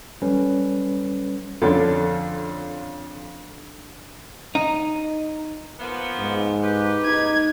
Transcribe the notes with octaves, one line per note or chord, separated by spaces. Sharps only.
F#3 G3 C#4 A4 B4
F2 D3 C#4 D4 A4
D#4
F3 A#3 B3
G#2
G4 B4
D#4 G#6